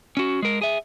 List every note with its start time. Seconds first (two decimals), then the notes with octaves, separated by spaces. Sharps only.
0.17 C#4 F#4
0.42 G#3 A#4
0.61 G#4 E5